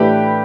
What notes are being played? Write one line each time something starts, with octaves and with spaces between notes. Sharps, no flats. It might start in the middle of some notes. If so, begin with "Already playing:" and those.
Already playing: A2 E3 A3 D4 G4 B4